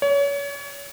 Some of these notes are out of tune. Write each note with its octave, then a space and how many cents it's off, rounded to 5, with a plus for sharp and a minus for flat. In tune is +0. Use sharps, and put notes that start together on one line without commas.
C#5 +30